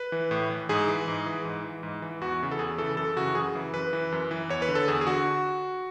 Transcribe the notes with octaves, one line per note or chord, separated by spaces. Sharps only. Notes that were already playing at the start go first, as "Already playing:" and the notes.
Already playing: B4
E3
A2
E3
G#2 G#4
E3
G#2
E3
G#2
E3
G#2
E3
E2 F#4
C#3 E3
A4
E2 G#4
C#3 E3 A4
F#2 A4
C#3 E3 F#4
F#2 G#4
C#3 E3
F#2 B4
E3
F#2
E3
E2 C#5
B4
D3
A4
E2 G#4
G#4
D3 F#4